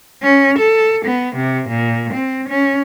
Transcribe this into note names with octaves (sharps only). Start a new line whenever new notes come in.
C#4
A4
B3
C3
A#2
C4
C#4